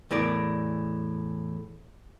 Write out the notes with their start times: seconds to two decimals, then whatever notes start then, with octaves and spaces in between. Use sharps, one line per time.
0.11 E2 A2 A#4 D5